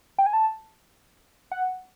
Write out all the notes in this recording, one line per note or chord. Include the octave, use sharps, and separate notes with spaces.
G5
G#5
A5
F#5